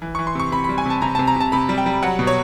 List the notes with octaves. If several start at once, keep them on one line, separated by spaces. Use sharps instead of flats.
E3
C#6
E3
C6
C3 C#6
C3 B5
B5
G3
G#5
C3 A5
C3 A#5
A5
C3
A#5
C3 A5
C3 B5
G3
G5
G3
F#3 F#5
B2
C#5